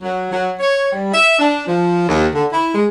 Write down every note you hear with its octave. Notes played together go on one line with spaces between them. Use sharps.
F#3
F#3
C#5
G3
E5
D4
F3
D#2
D3
E4
G#3